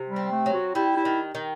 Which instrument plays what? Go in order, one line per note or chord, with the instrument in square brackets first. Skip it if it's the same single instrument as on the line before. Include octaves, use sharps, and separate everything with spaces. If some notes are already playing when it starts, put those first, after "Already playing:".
Already playing: [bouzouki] C3
[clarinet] G3
[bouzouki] C4
[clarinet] A3
[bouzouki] F#3
[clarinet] F#4
[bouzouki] G3 [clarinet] E4
[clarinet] E4
[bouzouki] D#3
D#3